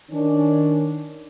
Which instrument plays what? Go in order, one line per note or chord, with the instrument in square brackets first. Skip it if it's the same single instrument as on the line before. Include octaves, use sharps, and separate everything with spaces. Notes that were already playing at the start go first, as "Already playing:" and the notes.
[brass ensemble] D#3 C#4 D4